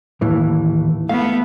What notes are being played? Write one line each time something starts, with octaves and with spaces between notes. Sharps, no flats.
D#2 A2 E3
A3 B3 F5